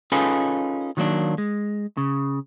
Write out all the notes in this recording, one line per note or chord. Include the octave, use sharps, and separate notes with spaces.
C#4 D#4 F4 G#4 A4 B4
D#3 F#3 A#3 C#4 D4
G#3
C#3